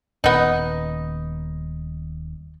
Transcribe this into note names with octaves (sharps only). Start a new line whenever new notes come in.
D#1 B3 D#4